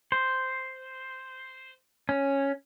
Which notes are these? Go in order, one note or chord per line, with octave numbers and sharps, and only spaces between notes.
C5
C#4